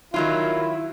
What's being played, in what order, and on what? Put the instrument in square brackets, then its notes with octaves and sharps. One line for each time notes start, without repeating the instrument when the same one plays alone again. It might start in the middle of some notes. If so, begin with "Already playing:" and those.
[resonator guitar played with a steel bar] D#3 F#3 F4 [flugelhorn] E4